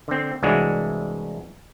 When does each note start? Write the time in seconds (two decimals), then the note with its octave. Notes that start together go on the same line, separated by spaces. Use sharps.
0.08 D3 C4
0.43 C2 E3 G#3 D4 F#4 C#5